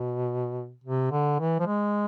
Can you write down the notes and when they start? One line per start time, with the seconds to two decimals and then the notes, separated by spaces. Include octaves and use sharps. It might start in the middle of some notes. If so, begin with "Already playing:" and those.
Already playing: B2
0.84 C3
1.12 D3
1.40 E3
1.60 F3
1.67 G#3